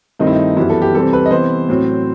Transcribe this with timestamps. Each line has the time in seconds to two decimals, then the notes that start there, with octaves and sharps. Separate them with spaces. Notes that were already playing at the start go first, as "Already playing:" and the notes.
0.19 G2 D#3 A3 C4 D#4
0.27 E4
0.35 D#4
0.57 F#2 E3 G3 B3 E4
0.70 A4
0.82 G4
0.95 C3 E3 G3 C4 A4
1.13 B4
1.26 D#5
1.31 C3 E3 B3 C5
1.69 A2 F#3 C4